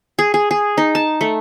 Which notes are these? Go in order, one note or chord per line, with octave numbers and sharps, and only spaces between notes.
G#4
G#4
G#4
D#4
A5
A3